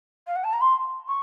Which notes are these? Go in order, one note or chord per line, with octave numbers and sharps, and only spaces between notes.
F5
F#5
A5
A#5
C6
C#6